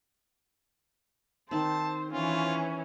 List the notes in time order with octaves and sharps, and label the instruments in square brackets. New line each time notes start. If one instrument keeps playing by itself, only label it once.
[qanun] D#3 C4 [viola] C5 [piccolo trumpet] A5
[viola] E3 C#4 [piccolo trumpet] F4